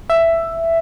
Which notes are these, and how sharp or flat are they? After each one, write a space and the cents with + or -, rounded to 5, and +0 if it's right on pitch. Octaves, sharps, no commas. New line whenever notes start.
E5 +10